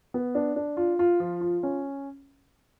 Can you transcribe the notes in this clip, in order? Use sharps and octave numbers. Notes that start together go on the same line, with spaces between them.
B3
D4
D4
F4
F4
F3
F4
C#4